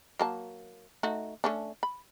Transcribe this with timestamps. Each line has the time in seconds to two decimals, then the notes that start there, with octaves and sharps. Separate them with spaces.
0.19 F#3 A#3 A5
1.03 A3 D#4 F#4
1.44 A3 C#4 D4
1.83 B5